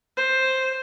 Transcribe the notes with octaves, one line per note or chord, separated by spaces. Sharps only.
C5